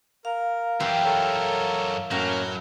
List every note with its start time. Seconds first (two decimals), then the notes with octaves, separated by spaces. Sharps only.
0.25 A#4 F5
0.80 F#2 E3 G3 G4 C6
1.05 A4 A#4 C#5
2.11 F#2 A2 F#3 A#3 C#4 A#4 A#5